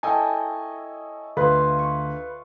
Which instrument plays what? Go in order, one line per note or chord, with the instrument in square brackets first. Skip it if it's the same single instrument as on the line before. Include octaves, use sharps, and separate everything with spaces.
[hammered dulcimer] E4 C#5 D#5 [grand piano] A4 G5 G#5
[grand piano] D2 [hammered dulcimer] F4 F5 [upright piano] B4
[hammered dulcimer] C#6